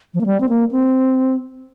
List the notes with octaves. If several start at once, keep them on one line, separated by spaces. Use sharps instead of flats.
F3
A#3
G3
C4
A#3
C4